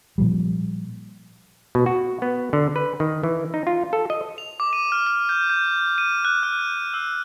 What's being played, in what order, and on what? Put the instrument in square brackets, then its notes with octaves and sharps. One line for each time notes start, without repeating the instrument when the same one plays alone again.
[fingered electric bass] A#2 F3 G3
[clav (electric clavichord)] B2
F#4
B3
D3
B4
D#3
E3
D#4
F4
A4
D#5
[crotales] F7
D6
D#7
F6
F6
G6
G6
D#7
F#6
F6
G6
E6